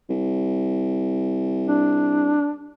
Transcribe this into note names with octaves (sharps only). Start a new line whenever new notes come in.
C2
D4